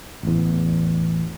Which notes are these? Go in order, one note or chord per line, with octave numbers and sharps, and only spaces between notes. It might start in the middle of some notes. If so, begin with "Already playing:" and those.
A1 E2